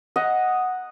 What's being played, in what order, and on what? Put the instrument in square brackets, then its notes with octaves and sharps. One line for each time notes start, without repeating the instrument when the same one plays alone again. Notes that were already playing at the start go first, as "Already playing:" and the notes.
[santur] D#5 F#5 A#5